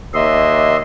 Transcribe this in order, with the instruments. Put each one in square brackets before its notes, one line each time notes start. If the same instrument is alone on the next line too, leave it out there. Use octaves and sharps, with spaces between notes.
[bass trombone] D#2 [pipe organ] D#5 E5 C6